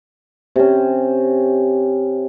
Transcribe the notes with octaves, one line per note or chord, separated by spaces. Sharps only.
C3 C#4